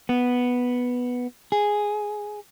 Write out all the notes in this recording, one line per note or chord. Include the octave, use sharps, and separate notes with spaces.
B3
G#4